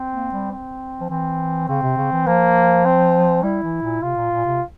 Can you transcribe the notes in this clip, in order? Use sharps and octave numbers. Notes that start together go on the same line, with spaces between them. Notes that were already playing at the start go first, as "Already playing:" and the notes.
Already playing: C4
A#3
G3
C4
F3
E3 C4
C#3 C4
C3
C#3
E3
F3 A#3
C4
G3 E4
E3
A#2
C3 F4
A#2
A#2
C3